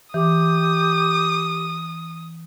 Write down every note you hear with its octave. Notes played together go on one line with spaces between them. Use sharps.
E3 G4 D#6